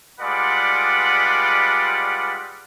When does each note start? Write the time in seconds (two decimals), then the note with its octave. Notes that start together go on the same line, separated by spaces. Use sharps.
0.20 G3 G#3 F4 B4 D5 F#5